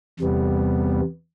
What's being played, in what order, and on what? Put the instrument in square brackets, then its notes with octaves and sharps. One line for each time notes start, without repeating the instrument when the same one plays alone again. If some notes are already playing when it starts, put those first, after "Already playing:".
[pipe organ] E2 C3 G3 B3